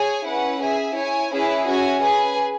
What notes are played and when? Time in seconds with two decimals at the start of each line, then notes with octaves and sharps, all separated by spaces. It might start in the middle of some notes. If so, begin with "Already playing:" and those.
Already playing: G#4 C#5 G#5
0.26 C#4 E4 B4 F#5
0.61 G#4 E5 G#5
0.96 E4 C#5 G#5
1.32 C#4 E4 G#4 B4 E5
1.67 C#4 F#4 E5 G#5
2.03 G#4 B4 G#5